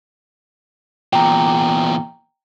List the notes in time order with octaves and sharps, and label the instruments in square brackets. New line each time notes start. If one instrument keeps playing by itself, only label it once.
[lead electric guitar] E2 A#2 [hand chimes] G5 A#5